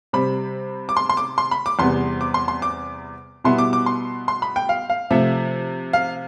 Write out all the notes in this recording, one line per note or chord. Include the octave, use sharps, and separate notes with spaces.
C3 G3 C4 B5
D6
C6
C6
D6
C6
B5
D6
E2 C3 G3 B3 C6
D6
C6
C6
D6
B2 G3 B3 E4 C6
D6
D6
C6
C6
B5
G5
F5
F5
C3 F3 A3 E5
F5